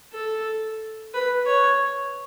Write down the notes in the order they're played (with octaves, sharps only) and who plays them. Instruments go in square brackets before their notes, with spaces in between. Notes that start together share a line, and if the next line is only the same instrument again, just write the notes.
[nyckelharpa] A4
B4
C#5